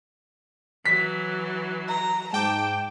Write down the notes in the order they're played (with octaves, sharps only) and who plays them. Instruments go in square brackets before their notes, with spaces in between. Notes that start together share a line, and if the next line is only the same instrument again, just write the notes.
[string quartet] E3 F#3 [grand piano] B6
[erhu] A#5
[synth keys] G#2 G5 D6 [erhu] A5